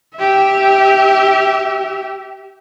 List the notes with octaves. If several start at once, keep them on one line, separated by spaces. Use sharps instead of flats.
G4 E5